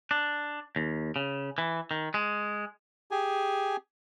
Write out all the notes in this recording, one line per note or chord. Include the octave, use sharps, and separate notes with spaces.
D4
D#2
C#3
E3
D#3
G#3
G4 G#4 G#5